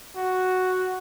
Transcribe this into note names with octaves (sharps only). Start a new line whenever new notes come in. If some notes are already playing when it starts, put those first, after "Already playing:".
F#4